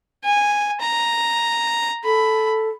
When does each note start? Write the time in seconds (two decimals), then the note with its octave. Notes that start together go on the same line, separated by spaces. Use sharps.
0.24 G#5
0.80 A#5
2.04 A4 B5